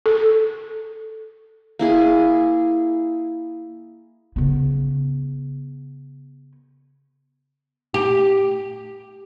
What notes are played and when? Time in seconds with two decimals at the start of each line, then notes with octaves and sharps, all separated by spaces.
0.06 A4
1.79 A#3 E4 G#4
4.36 C#3 B3
7.94 G4